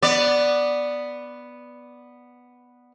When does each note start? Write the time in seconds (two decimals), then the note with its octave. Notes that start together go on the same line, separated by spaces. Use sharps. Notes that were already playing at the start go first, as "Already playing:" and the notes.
0.02 B3 D5